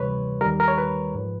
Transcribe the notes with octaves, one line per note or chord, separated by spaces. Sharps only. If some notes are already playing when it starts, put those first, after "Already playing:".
Already playing: D2 C3 E3 G3 B4 C#5
D#2 D#3 G3 A#4
A#4
C#5
B4
G#2 F3